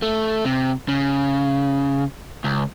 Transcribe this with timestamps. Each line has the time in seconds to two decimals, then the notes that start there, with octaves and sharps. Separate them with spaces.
0.02 A3
0.45 C3
0.88 C#3
2.44 C#2